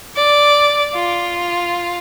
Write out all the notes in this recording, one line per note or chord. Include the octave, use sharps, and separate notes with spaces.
D5
F4